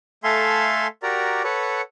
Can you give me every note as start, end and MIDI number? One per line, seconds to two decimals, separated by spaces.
0.24 0.87 57
0.24 0.87 69
0.24 0.87 76
0.24 0.87 77
0.24 0.87 80
0.24 0.87 84
1.03 1.42 66
1.03 1.42 67
1.03 1.42 70
1.03 1.42 74
1.03 1.42 82
1.44 1.81 69
1.44 1.81 71
1.44 1.81 73
1.44 1.81 78